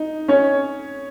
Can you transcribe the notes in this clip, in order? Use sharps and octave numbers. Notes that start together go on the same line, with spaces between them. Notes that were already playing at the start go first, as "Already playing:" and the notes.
Already playing: D#4
C#4 C#5